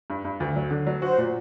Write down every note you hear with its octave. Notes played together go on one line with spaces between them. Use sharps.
G2
G2
D2
F#3
D3
F#3
F#4 C5
A#2